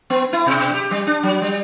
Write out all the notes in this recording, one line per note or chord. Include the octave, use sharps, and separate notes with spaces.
B3
E4
B2
G4
G3
D4
F#3
G3